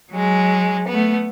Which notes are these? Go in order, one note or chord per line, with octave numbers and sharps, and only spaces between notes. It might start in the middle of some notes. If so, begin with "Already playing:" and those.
F#3 G#3
A3 B3